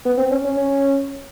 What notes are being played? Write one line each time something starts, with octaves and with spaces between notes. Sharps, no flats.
B3
C4
C#4
C#4
C#4